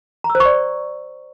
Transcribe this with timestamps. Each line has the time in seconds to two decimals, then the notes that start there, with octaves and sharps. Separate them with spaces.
0.24 A#5
0.30 E6
0.35 C5
0.40 C#6
0.45 D5